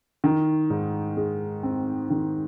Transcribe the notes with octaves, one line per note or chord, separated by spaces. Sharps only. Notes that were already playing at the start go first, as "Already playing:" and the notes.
D#3
G#2
G#3
C4
D#3